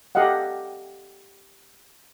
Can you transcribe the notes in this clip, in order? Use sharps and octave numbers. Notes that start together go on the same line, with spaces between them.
G4 A4 D#5 F5 F#5